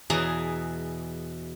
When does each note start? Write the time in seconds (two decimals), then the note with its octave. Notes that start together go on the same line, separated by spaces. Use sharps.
0.10 E2 B2 E3 G#4 G#5 A#5